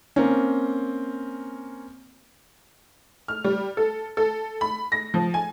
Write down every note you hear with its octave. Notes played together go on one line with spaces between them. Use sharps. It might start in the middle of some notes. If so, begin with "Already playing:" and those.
A#3 C4 C#4
F6
G3
A4
A4
B5
A#6
F3
G#5